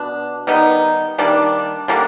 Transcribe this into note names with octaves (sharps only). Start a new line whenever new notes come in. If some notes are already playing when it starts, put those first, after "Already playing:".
Already playing: B2 B3 D4
D#3 G3 B3 D#4
D#3 G3 A#3 D4
D3 G3 A#3 D4